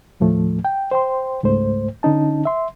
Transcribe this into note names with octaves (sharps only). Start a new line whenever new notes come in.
D#2 A2 F3 A3
G5
C5 G5 C6
C#2 G#2 A3 C5
D3 C#4 D#4 A5
E5 C6